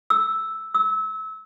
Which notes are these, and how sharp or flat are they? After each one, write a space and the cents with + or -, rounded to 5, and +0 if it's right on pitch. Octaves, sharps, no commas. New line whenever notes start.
E6 -5
E6 -25